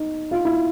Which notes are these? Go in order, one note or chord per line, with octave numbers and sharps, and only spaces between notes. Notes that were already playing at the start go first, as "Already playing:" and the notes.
Already playing: D#4
F4
E4